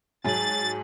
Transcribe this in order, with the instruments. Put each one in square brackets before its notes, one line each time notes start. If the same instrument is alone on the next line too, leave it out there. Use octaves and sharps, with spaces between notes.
[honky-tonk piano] G#2 F#3 [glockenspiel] G#5 A5 F#7 [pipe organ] A6